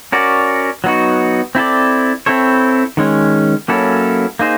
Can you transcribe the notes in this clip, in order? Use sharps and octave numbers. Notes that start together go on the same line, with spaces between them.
C#4 F#4 A#4 D5
F#3 B3 D#4 F#4
C4 E4 A4 D5
C4 E4 A4 C#5
D#3 G#3 C#4
F#3 A#3 C#4 E4 A4
A#3 D#4 G#4 C5